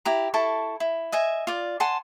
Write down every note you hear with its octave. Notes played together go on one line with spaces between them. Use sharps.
E4 G4 A#5
E4 A4 A5 C#6
E4
D#5 E5 G#5
F4 D5
F#5 G#5 A5 C6